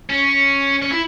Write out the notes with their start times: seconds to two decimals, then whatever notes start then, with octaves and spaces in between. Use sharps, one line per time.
0.09 C#4
0.82 C#4
0.91 E4